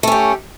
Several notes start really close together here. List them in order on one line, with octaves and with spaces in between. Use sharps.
A3 C#4 G4